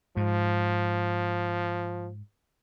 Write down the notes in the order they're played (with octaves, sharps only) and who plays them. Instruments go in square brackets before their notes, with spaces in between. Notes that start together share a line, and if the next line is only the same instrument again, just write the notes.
[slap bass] G#2 [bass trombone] F3